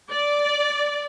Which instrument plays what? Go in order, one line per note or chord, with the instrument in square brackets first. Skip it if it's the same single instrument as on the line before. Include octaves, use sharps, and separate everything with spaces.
[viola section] D5